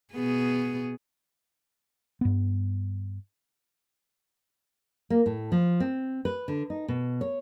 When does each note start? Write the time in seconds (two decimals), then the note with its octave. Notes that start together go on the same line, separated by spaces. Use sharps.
0.14 B2 B3 G#4
2.21 G2 B3
5.10 A#3
5.26 A2
5.52 F3
5.80 C4
6.25 B4
6.48 D3
6.70 D#4
6.88 B2
7.21 C#5